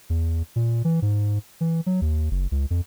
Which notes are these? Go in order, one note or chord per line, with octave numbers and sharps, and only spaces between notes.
E2
A#2
E3
G#2
E3
F#3
D#2
F#1
C#2
F2